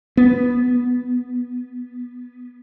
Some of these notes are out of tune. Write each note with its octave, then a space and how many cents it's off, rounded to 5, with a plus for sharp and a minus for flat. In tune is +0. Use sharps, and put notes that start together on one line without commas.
B3 -10